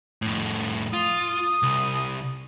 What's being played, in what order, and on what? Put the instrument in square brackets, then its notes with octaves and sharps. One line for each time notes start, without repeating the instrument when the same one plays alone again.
[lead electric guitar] F2 A2
[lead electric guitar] F4 [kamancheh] D#6
[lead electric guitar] C2